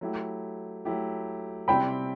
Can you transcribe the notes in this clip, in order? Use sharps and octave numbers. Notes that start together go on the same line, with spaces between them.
F#3 A3 E4 G4
F#3 A3 E4 G4
C3 G3 C4 E4 G4 G5 B5